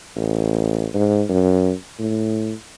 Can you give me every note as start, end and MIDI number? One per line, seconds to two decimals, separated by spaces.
0.16 0.86 33
0.94 1.23 44
1.29 1.72 42
1.99 2.53 45